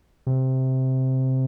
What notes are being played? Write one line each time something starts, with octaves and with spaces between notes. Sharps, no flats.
C3